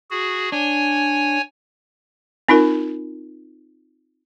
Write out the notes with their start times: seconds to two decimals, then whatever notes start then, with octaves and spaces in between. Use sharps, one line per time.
0.11 F#4 G#4
0.52 D4 C#5 G#5
2.49 C4 D#4 F4 A#4